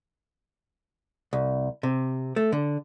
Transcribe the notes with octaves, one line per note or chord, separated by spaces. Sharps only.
C2
C3
A3
D3